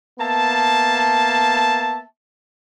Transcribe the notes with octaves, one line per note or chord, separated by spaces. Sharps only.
A#3 B3 E5 A5